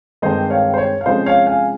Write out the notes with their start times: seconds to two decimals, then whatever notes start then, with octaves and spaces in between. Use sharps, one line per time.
0.22 G2 D#3 G#3 C4 C5 D#5
0.50 C#5 F5
0.74 C5
0.78 C#5
1.01 F5
1.06 C3 F3 G#3 C#4 C5 D#5
1.26 C#5 F5
1.47 F5 G#5